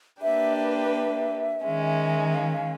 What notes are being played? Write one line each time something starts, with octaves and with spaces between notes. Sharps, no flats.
A#3 D4 G4 B4 E5
E5
D#3 G#3 C#4
F5
F5